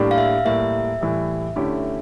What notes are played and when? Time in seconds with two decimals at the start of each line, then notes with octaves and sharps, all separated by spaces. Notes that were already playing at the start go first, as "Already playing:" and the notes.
Already playing: A2 G3 A#3 D4 G4
0.11 F5
0.18 E5
0.45 A2 G3 A#3 E5
1.01 A2 E3 G3
1.56 D3 A3 C#4 E4 G4